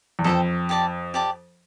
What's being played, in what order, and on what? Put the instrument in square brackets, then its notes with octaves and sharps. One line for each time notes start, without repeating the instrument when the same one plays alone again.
[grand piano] E2
[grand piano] F2 [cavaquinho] A4 C5 G5
[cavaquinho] G4 D5 A5
G4 D5 A5